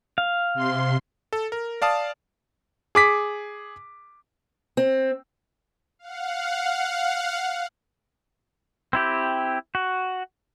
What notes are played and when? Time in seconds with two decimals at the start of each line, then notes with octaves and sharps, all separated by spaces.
0.18 F5
0.54 C3 C6
1.33 A4
1.52 A#4
1.82 D5 F5 A5 D#6
2.95 G#4 D6 B6
4.77 C4
5.99 F5 F#5
8.93 C4 E4 G4
9.75 F#4